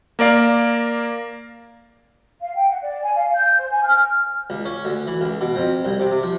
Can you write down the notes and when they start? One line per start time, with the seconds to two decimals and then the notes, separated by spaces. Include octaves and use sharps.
0.19 A#3 A#4 D5 F5
2.40 F5
2.56 G5
2.69 F#5
2.81 D5
3.03 G#5
3.15 F5
3.33 G6
3.59 C5
3.71 G#5
3.83 F6
4.50 C#2
4.65 C#4
4.85 D2
5.07 E3
5.21 C#2
5.41 B2
5.56 F2
5.85 C2
6.00 C3
6.11 C3
6.23 F3